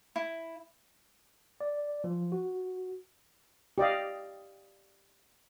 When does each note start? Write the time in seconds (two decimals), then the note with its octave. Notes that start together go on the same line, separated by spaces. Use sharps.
0.16 E4
1.61 D5
2.04 F3
2.32 F#4
3.78 G4 D5 D#5 F5